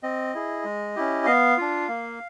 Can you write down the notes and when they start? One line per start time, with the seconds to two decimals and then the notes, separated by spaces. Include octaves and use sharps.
0.03 C4 D#5
0.34 E4 G#4
0.65 G#3
0.96 C#4 E4 G4
1.26 B3 F5
1.57 D4 F4
1.88 A#3